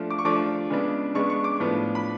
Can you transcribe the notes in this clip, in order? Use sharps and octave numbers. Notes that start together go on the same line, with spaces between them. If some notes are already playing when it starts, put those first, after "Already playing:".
Already playing: F3 A3 D4
D6
C#6
F3 A3 D4 D6
C#3 G#3 B3 D4
C#3 G#3 B3 D4 C#6
C#6
D6
A2 F3 B3 D4
B5